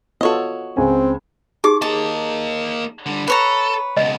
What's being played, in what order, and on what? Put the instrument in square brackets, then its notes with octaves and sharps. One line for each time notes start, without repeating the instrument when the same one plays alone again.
[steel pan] B3 F4 A4 [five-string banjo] F#4 C#5 D#5
[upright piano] C#2 G#5 [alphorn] C4
[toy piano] D#4 G4 G#4 [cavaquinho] D6
[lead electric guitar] A#3 D#5 [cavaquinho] A5
[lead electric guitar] D3 G3
[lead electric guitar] A4 [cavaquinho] B4 C#5 A#5
[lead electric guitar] C#2 B2 [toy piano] D#5